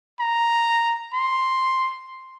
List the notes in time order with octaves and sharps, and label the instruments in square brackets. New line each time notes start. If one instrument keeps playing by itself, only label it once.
[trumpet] A#5
C6